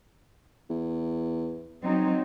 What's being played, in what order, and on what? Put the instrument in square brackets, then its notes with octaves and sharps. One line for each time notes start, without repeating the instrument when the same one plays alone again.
[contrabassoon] E2
[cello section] F#3 C4 D#4